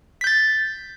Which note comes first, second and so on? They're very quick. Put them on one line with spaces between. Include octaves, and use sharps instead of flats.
B6 G6 A6